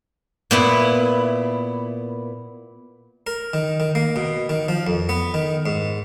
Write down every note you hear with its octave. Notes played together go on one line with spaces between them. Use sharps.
A#2 B3 E4
A#4
D#3
D#3
A#3
B2
D#3
F3
F2
B3
D#3
G#2